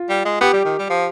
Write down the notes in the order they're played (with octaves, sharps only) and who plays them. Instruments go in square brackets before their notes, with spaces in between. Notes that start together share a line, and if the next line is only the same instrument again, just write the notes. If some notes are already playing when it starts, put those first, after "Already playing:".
Already playing: [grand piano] F4
[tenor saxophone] G3
G#3
[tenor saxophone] B3 [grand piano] G4
[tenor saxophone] G3
D#3
G3
F3